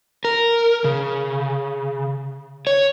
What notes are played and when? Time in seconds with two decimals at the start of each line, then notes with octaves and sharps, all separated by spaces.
0.25 A#4
0.84 C#3
2.67 C#5